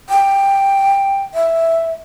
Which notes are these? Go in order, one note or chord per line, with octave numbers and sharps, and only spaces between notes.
G5
E5